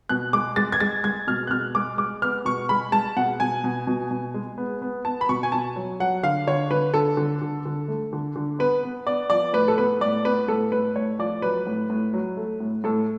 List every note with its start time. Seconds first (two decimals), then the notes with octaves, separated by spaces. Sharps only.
0.09 B2 F#6
0.33 G#3 D6
0.56 G#3 A6
0.72 G#6
0.80 G#3 A6
1.04 G#3 G#6
1.27 B2 F6
1.47 F#6
1.51 B2 F6
1.75 G#3 D6
1.98 G#3 D6
2.22 B3 F6
2.45 B2 C#6
2.69 G#3 B5
2.92 G#3 A5
3.17 B2 F#5
3.40 B2 G#5
3.64 B2
3.87 B2
4.11 B2
4.34 G#3
4.58 B3
4.82 B3
5.05 B3 A5
5.21 B5
5.29 B2 C#6
5.43 G#5
5.52 B2 A5
5.76 F#3
6.00 F#3 F#5
6.23 D3 F5
6.47 D3 C#5
6.71 D3 B4
6.94 D3 A4
7.17 D3
7.42 D3
7.66 D3
7.88 A3
8.13 D3
8.36 D3
8.59 B3 B4
8.83 B3
9.07 B3 D5
9.30 F3 D5
9.53 A2 B4
9.68 A4
9.77 B3 B4
10.01 A2 D5
10.25 B3 B4
10.48 A2 A4
10.72 A2 B4
10.96 A2 C#5
11.19 F3 D5
11.42 F#3 B4
11.67 A2
11.90 A2
12.14 F#3
12.37 A3
12.60 A2
12.84 A2 A4